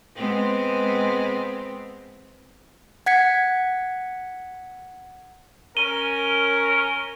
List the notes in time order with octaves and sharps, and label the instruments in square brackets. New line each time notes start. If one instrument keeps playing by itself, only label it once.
[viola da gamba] G#3 B3 C4
[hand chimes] F#5 G#6 B6 C#7
[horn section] C#4 A#4 [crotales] D#7 G7